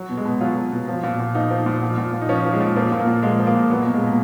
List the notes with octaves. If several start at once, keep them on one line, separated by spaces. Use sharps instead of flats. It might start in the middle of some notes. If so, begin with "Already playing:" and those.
Already playing: F#3
B2
G#3
B2
F#3 F4
F#3
B2
F3
A#2
A#2
F3 D#4
F3
A#2
F3
A#2
A#2
D#4
F3 C#4
F3
G#3
A#2
F3 A#3
A#2
A#3
A#2
F3 G#3
F3
A#3
A#2
F#3 B3
A#3
B2
G#3
B2 A#3